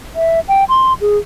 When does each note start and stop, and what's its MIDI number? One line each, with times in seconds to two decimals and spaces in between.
0.15 0.40 76
0.48 0.64 79
0.69 0.93 84
1.01 1.17 68